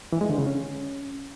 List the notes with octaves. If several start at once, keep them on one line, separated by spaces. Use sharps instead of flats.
E3
G#3
D3
C#3
C#4